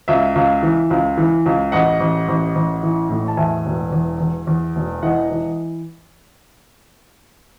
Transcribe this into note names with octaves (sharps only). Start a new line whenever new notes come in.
C#2 E5
C#2
E3
C#2
E3
C#2
A1 D#5 F#5
A1
A1
A1
E3
A2
A5
E2 E5 G#5
E1
E2
E2
E2
E1
E3 D#5 F#5
E3